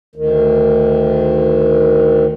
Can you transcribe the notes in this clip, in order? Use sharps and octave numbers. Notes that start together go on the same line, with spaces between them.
D2 D#3